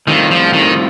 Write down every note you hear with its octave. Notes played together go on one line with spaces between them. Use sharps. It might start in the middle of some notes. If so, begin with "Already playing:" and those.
A2 D#3 G3 C4 F4
F3
D#3